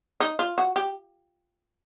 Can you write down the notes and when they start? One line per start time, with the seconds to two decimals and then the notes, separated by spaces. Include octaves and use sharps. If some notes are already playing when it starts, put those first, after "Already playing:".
0.20 D#4
0.39 F4
0.58 F#4
0.76 G4